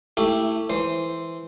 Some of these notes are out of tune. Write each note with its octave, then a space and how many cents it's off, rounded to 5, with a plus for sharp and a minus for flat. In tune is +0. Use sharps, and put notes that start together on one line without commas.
A3 +20 E4 +0 G4 +0
E3 +0 C5 -5